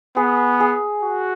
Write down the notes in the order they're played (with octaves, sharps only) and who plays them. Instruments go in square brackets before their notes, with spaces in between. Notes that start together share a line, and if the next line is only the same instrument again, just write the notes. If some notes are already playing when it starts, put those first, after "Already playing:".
[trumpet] B3 [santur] G#4
[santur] G#4
[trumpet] F#4